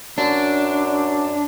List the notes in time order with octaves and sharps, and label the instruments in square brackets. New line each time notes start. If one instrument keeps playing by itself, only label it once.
[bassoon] F#2 [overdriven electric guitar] D4